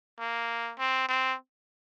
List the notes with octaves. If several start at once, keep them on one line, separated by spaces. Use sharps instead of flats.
A#3
C4
C4